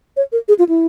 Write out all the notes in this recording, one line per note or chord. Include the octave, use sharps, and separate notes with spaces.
C#5
A#4
G#4
F4
E4